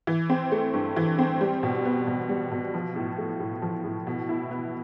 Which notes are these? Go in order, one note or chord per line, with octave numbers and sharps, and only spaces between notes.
E3
C4
A3
G2
E3
C4
G3
B2
B3
B2
G3
B2
F3
A2
A3
A2
F3
A2
B2
E4
B3